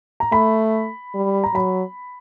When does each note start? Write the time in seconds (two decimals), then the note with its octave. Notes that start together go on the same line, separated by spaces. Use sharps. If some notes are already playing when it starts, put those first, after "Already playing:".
0.20 A#5
0.32 A3 B5
1.14 G3
1.44 A#5
1.54 F#3 B5